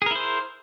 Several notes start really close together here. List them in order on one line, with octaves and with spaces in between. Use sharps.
G#4 A#4 E4 C5